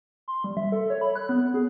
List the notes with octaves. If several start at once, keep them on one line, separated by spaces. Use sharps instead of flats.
C6
G3
E5
A4
C#5
B5
F#6
B3
G#4